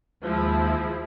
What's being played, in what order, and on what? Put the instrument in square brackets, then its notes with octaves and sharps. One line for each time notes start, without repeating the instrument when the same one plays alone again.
[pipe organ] D#2 [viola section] F3 G#3 E4